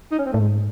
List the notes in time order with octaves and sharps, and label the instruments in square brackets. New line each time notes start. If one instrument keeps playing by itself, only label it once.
[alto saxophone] D#4
C#4
C4
[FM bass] A2 [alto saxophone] A3
[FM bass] G#2 [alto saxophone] G#3